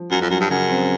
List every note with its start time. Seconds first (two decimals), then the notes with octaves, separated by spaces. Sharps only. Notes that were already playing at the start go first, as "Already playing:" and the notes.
Already playing: F3
0.11 F#2 F#3
0.21 F2
0.30 F#2 F#3
0.40 G2
0.50 F#2 C#3
0.69 C4